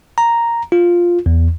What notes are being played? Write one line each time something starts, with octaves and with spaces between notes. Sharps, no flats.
A#5
F4
E2